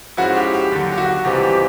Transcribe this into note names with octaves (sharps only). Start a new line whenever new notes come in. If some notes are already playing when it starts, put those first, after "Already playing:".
G#2 F3 G#3 C#4 E4 F#4
G4
G4
D#2 D3 F#3
G4
F#4
C#2 C3 E3 G3 C4 G4
G4